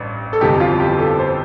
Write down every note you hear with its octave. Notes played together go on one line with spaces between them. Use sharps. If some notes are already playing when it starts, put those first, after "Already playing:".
Already playing: A1 G2
A4
G1 F2 C3 E3 G4
F4
G4
A4
C5